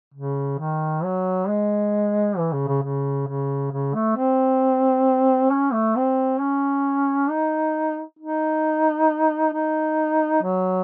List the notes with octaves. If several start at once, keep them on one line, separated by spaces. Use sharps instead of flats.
C#3
D#3
F#3
G#3
E3
C#3
C#3
C#3
C#3
C#3
A3
C4
C#4
A3
C4
C#4
D#4
D#4
D#4
F#3